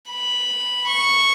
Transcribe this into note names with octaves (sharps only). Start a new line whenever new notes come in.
B5
C#6